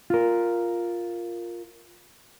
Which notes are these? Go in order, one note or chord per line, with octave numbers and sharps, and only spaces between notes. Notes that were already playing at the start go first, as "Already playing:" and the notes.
F4 A#4